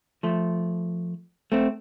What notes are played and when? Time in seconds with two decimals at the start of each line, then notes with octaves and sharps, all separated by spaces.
0.23 F3 A3
1.52 A3 C4